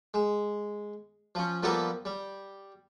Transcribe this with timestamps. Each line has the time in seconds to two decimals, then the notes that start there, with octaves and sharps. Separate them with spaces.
0.14 G#3
1.35 F3 C#4
1.63 F3 G3 A#3 B3 A4 A#4
2.05 G3